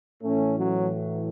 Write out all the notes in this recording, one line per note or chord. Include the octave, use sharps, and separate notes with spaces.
A2 E3 A3 C#4
F#3